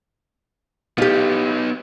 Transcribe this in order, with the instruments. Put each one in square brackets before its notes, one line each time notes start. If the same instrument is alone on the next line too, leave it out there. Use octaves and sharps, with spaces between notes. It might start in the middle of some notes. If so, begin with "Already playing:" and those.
[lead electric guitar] B3 D#4 [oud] F4 G4